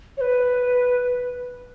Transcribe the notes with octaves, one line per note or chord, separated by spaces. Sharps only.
C#5
B4